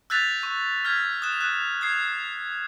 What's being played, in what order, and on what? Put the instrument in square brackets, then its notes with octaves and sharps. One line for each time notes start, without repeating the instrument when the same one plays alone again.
[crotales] E6 F#6 G6 A6 B6 F7
C#6
F6 G6 G#6 B6
D#6 F#6 E7
F#6 E7
D#6 G#6 C7